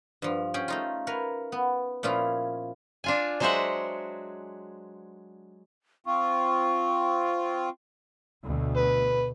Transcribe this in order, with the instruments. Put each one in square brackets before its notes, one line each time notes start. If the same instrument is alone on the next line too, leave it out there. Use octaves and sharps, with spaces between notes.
[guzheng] G2 F3
C#4 G#4 G5
A3 D#4 F4
A#4 B4 C#5
B3
A#2 F3 C#4 E4 F4
[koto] D4 F4 G#5
F#3 G#3 F#4 C5 E5 F#5
[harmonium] C4 F4 [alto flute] C#6
[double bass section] D2 B2
[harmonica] B4